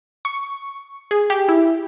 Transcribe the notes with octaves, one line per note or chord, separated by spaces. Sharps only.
C#6
G#4
G4
E4